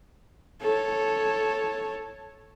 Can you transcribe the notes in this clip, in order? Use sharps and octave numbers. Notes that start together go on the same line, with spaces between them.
A4 C#5